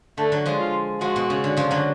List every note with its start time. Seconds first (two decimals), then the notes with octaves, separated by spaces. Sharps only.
0.18 D3 A3
0.32 D3 F#3
0.46 F3 G#3
0.60 F4
1.01 F3 G#3 F#4
1.16 B2
1.30 C#3
1.44 D3
1.57 C#3 F3
1.71 D3 F#3